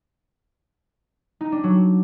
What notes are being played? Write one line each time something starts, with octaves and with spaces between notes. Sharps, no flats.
D#4
D4
F#3